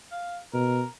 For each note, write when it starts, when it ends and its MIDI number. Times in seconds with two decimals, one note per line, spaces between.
0.11 0.38 77
0.53 0.83 47
0.53 0.88 70